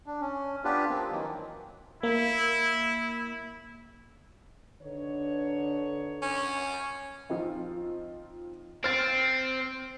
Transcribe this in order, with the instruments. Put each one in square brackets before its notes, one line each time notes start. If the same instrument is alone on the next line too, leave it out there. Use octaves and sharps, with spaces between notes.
[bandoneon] D4
C#4
B3 D4 F4 G4 B4
F3 A#3 C4
D#3 E3 F#3 A#3
[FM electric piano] A#3 [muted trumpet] E4
[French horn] D3 [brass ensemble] D#4 B4 C#5
[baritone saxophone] C#4
[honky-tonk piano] F3 C4 D#4
[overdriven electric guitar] C4 [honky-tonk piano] F6 A6 D7